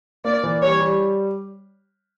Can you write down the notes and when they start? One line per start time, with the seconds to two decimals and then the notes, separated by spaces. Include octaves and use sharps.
0.25 A#3 D5
0.43 E3
0.62 G3 C#5
0.80 G3